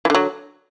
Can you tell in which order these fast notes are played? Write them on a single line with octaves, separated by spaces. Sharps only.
E3 D3 F#3